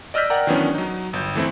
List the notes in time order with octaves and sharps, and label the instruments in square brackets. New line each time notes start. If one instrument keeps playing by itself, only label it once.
[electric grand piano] D5 D#5 E6 F6 G6 B6
A#4 D5 F#5 G5 A#5
D#3 E3 F#3 B3 C#4 D4
F#3 D#4
G1 G6
E3 A3 C4 E4